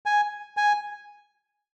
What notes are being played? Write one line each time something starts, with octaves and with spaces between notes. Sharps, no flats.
G#5
G#5